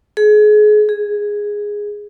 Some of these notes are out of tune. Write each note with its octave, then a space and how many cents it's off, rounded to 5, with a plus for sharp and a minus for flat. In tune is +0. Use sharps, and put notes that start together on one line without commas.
G#4 +30
G#4 -5